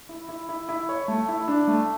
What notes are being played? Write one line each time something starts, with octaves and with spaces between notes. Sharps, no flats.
E4
E4
E4
E4
C#5
A3
E4
D4
A3